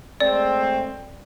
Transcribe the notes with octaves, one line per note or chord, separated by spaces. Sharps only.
G#3 A3 C4 D5